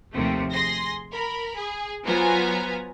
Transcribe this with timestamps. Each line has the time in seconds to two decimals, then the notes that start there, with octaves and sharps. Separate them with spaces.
0.14 D#2 C3 F3 A3
0.52 G#4 C6 A#6
1.12 A#4 B5
1.56 G#4
2.05 F#3 B3 F4 C5 G#5 A#5